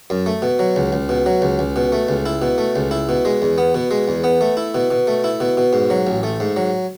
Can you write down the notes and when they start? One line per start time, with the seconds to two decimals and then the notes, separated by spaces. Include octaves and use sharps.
0.10 F#2
0.26 A3
0.42 B2
0.59 F#3
0.76 C#2
0.93 C#2
1.09 B2
1.26 F#3
1.42 C#2
1.59 C#2
1.76 B2
1.92 A3
2.09 C#2
2.26 E4
2.42 B2
2.58 A3
2.76 C#2
2.91 E4
3.09 B2
3.25 G#3
3.42 E2
3.58 B3
3.75 B2
3.91 G#3
4.08 E2
4.24 B3
4.41 A3
4.57 E4
4.75 B2
4.91 B2
5.07 A3
5.24 E4
5.40 B2
5.57 B2
5.73 G#2
5.90 F#3
6.07 A1
6.23 A3
6.40 G#2
6.57 F#3